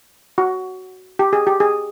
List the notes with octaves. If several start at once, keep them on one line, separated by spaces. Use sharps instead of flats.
F#4
G4
G#4
G4
G#4